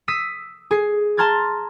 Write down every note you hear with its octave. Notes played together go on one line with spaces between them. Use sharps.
D#6 E6 B6 C7 D#7
G#4 C7
A5 A#5 C6 F6 G#6 A6